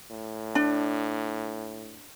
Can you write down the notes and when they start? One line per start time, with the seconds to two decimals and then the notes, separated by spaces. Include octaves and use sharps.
0.10 A2
0.55 D4